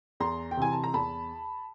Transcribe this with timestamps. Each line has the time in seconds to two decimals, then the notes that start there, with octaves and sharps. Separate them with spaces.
0.20 E2 A#5 C6
0.51 G5
0.57 C3 E3 G#5
0.72 A5
0.84 A#5
0.94 E2 A5 B5